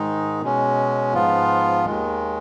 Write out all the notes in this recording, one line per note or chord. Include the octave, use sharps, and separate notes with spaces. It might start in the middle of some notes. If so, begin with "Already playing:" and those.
Already playing: G#2 D#3 G#3 D#4
B2 G#3 C#4
G#2 F3 B3 F4
D#2 D#3 G#3